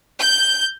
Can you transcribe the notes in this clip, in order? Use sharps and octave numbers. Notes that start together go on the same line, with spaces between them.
G6